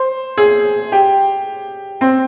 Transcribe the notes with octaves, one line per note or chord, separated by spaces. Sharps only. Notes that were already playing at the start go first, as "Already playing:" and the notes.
Already playing: C5
G#4
G4
C4